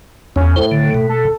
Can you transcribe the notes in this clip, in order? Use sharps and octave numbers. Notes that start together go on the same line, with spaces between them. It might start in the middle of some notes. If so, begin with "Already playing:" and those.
E2 C#4
A2 C5
D3
B2
A4